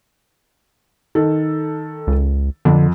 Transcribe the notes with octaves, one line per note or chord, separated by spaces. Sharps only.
D#3 A4
C#2
F2 D3